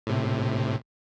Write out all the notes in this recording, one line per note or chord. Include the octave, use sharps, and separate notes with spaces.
A2 C3